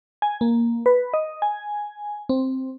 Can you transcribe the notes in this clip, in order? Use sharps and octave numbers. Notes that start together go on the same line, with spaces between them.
G#5
A#3
B4
D#5
G#5
C4